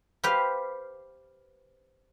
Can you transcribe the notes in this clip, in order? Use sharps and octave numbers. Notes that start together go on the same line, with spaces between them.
G4 B4 C5 F5